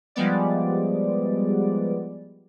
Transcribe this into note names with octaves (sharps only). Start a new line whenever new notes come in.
F3 G3 G#3 B3 D5